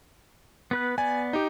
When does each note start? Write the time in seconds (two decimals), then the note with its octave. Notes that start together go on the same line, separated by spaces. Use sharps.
0.71 B3 B4 F#6
0.98 B3 D5 G#5
1.33 D#4 G4